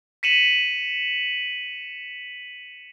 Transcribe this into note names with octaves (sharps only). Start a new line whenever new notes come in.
B6 C#7 D#7 E7 F#7